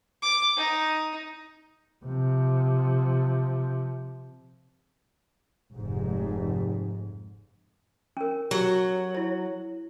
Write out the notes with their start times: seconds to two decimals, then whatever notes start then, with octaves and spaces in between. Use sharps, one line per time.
0.22 D6
0.57 D#4
2.05 C3 F3
5.73 F1 G#2
8.17 C#4 A#4
8.51 F#3 G4
9.15 E4 C#5